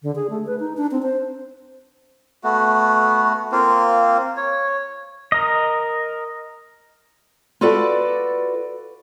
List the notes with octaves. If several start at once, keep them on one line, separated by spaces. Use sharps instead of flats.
D3
G#4
A3
B4
D#4
D4
C4
C5
A3 B3 F#4
A#3 C4 F4
C#5
A#4 D#5
F4 F#4 A4 B4 D5 F#5